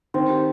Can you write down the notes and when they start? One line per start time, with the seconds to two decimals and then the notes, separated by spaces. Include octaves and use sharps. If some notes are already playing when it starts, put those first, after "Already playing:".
0.14 D#3 C4
0.29 G4